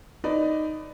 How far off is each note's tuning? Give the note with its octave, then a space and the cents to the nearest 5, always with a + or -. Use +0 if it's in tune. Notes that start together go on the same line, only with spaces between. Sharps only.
D#4 +0 B4 +20 D5 +0